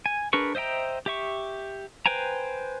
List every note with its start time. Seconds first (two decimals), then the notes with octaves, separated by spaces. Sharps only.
0.06 G#5
0.33 D4 G#4 A#4 B4 C#6
0.55 C5 D#5 E5 G5 A#5
1.06 G4 E5 C#6
2.06 B4 C5 G5 G#5 A#5